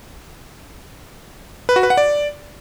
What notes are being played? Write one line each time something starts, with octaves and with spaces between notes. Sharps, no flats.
B4
F#4
B4
F#5
D5